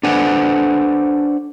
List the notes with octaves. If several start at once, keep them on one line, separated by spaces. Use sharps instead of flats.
D4 A4 B4 C5 F#5 G#5